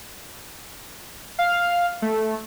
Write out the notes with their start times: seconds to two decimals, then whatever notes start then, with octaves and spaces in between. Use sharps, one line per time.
1.39 F5
2.02 A3